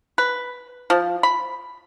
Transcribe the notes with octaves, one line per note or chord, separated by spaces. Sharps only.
B4
F3
B5